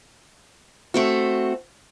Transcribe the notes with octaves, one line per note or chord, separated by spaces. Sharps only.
A3 C4 F#4